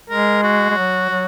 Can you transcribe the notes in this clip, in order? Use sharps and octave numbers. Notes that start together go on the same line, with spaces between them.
G#3 A#4
F#4
G#3
F#3
F#3